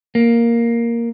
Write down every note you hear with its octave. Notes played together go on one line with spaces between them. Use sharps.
A#3